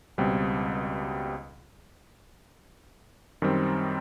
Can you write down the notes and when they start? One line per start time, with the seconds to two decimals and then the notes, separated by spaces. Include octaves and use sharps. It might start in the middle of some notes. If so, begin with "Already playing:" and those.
0.18 C#2 B2 G3 C4
3.42 F#2 D#3 G3 C4